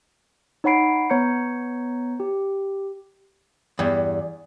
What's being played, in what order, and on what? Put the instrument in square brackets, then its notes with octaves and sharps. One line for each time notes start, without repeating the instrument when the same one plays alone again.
[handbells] D#4 C#5 F#5 B5 C7 D7
B3 C#5 A#5 G6 C#7
G4
[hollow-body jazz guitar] E2 G2